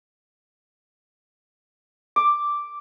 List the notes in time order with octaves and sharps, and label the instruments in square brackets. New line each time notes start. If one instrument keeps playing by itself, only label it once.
[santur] D6